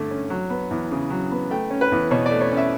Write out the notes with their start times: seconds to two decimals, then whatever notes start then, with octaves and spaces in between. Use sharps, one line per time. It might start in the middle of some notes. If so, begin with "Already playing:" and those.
Already playing: G2 D3 A3
0.11 C#4
0.30 F#3
0.50 B3
0.71 E2
0.91 C#3
1.10 F#3
1.31 B3
1.51 A3 G5
1.71 C#4
1.81 B4
1.92 E2
2.11 B2 C#5
2.26 D5
2.31 A3
2.41 C#5
2.51 C#4
2.57 E5